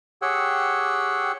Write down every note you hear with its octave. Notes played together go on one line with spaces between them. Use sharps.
G4 G#4 C#5 F#5 G5 E6